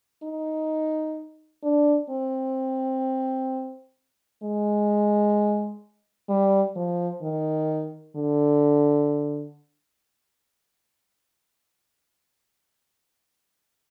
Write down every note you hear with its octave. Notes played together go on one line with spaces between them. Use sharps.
D#4
D4
C4
G#3
G3
F3
D#3
D3